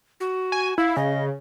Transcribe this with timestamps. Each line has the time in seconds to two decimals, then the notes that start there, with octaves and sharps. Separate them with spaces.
0.20 F#4
0.52 G#5
0.78 E4 F5
0.97 C#3 D#5